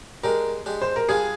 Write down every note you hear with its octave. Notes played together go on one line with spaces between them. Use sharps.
G#3 D4 G4 A#4
G#3 D4 G4
C5
A#4
G3 D4 F4 G#4